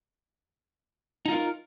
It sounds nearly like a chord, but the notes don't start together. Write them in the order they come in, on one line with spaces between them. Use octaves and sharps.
D#4 F4 A#4